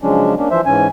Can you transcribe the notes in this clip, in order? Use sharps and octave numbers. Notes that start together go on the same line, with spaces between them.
C#3 F3 F#3 G#3 C#4 D4
A#3 C#4 D4
E3 F3 C5 E5
G#2 E3 C#4 G#5